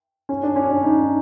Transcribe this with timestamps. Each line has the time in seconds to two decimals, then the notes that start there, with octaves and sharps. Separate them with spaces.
0.29 C#4
0.43 D4
0.56 C#4
0.70 D4
0.84 D#4